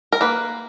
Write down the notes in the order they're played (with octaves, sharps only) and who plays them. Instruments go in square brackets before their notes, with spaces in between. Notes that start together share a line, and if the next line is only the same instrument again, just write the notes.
[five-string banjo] A#4
A#3 B4